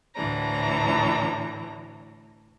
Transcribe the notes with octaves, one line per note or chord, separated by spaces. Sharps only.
D2 A2 E3 D4 A#5